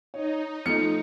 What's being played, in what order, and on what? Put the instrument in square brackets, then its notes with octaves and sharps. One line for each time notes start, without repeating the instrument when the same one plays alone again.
[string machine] D#4 [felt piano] C#5
[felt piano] F3 A3 [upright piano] C#7